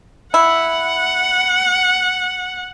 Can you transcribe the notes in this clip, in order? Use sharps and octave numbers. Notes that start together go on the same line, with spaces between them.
E4 F#5